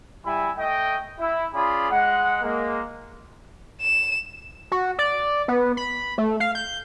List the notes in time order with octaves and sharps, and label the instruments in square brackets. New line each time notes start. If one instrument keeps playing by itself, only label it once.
[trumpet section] G3 E4 E5 G#5 B5
A3 D#5 G5
E4
C#4 F4 G#4 D5 B5
G#3 F#5
G#3 A#3
[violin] E7
[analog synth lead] F#4
D5
B3
B5
A3
F5
G6